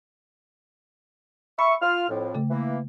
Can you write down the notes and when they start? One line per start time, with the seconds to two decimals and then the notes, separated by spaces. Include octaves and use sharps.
1.59 E5 B5 C#6
1.81 F4 F6
2.09 F2 A2
2.35 C#3 A3
2.51 E3 A#3